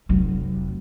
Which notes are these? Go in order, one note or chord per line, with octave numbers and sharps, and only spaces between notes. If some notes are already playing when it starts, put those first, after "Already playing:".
F1 F#3